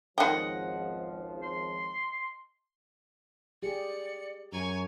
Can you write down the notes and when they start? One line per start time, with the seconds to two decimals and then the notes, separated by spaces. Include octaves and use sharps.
0.18 G#1 C#2 D#3 F3 D#5 F#5 G5
1.43 C6
3.63 G4 G#4 D5 C#7
4.52 F#2 G#5 A#5 C#6